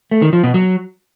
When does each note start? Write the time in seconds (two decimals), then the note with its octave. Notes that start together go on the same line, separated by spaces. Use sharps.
0.11 A3
0.22 D#3
0.33 F3
0.44 B2
0.54 F#3